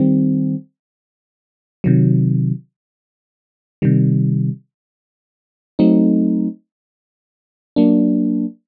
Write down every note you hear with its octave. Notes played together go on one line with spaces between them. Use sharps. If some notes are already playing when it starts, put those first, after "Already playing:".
Already playing: D#3 G3 C4
C3 D#3 F#3
C3 D#3 G3
F#3 A3 C4 D#4
F#3 A#3 D4